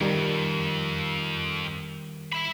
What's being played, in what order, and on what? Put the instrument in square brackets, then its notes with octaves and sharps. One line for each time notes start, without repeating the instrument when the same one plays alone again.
[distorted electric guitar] F2 [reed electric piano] D#3 G3 A#4
[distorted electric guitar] E5 B5